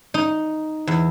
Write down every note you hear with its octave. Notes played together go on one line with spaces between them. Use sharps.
D#4
E2